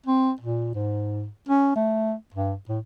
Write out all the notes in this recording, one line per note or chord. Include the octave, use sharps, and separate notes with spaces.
C4
A#2
G#2
C#4
A3
G2
A2